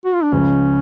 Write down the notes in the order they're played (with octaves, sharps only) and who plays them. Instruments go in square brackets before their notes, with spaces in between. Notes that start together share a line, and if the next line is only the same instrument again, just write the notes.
[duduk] F#4
F4
D4
[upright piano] C#2 C#3 F3 [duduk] C#4